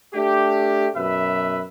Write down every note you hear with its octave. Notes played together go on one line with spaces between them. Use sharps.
A3 D4 G4
F#2 B2 B4 E5